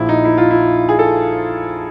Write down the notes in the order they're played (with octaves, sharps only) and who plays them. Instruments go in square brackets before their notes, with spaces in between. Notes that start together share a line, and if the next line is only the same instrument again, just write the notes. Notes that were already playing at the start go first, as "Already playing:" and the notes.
Already playing: [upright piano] A#1 A#2 F3 E4
D#4
E4
F4
E4
G#4
A4